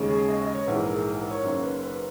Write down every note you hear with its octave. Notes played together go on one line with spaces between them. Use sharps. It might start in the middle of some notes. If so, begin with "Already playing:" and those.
Already playing: D#2 C#3 G#3
G#4
D#5
D#5
C#5
A#1 G#2 E3 B4
A#4
G#4
A#4
A#4
C#5
F#1 F#2 D#3 A#3 C#5
B4
B4